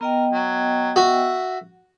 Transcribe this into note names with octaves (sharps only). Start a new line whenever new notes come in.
B3 A#4 D#5 G5
F#3
F#4 E5